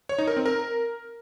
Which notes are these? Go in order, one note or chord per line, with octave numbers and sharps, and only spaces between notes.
C#5
D#4
A#4
C4
A#4